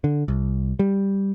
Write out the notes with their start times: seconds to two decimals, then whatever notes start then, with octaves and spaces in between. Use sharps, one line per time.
0.04 D3
0.28 C2
0.79 G3